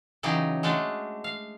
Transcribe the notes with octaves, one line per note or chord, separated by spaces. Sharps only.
C#3 E3 F#3 D#4 G4
G#3 A3 D4 F#4
F5